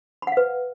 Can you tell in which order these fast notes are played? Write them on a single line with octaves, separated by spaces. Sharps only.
B5 F#5 F5 B4